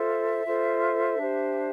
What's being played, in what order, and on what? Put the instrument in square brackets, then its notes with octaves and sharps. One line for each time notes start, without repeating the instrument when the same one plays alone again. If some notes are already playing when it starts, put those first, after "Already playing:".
Already playing: [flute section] F4 A4 C5 E5
F4 A4 C5
D4 G4 C5